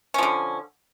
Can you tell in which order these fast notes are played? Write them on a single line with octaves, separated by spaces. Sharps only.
C#4 F3 D3